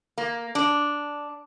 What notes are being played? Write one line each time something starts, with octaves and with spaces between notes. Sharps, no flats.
A#3
D4